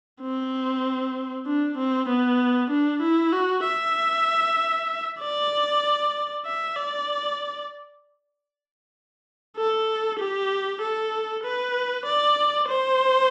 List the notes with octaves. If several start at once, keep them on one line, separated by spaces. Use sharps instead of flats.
C4
D4
C4
B3
D4
E4
F#4
E5
D5
E5
D5
A4
G4
A4
B4
D5
C5